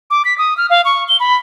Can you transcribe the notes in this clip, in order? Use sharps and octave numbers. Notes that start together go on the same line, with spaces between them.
D6
B6
D#6
F6
F5
C#6
G7
B5